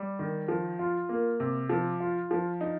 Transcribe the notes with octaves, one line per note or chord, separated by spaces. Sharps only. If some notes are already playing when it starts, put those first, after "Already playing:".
Already playing: G3
D#3
F3
F4
A#3
C3
F3
F4
F3
D#4